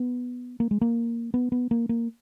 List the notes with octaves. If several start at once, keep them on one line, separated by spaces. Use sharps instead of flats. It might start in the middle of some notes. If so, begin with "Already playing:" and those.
Already playing: B3
A#3
G#3
A#3
B3
B3
A#3
A#3